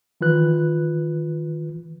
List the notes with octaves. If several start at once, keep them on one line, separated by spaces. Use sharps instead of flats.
D#3 E3 F4 B4 F#6